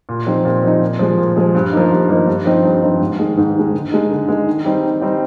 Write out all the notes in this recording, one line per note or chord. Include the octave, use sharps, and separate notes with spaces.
A#2
F3 C4 D#4
A#2
F3 C4 D#4
A#2
F3 G#3
A#2
F3 G#3
G2
F3 A#3 D#4
G2
F3 A#3 D#4
G2
F3 C4 D#4
G2
F3 C4 D#4
G#2
D#3 G#3
G#2
D#3 G#3
D3
G#3 D#4
D3
G#3 D#4
D#3
G3 C4 D#4
D#3
G3 C4 D#4